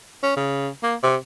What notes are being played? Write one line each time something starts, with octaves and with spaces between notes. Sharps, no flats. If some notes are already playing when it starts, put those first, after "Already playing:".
C#4
C#3
A#3
C3